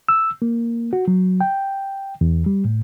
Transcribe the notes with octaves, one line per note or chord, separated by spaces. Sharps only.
E6
A#3
F#4
F#3
G5
E2
G3
A2